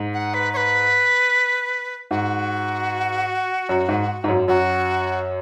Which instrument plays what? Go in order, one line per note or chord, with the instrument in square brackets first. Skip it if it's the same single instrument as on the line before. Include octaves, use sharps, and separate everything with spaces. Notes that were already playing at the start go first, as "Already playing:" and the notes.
Already playing: [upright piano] G#2
[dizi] F#5
B4
C#5
B4
[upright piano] G#2 [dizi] F#4
[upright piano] F#2
G#2
G#2
F#2
[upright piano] F#2 [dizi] F#4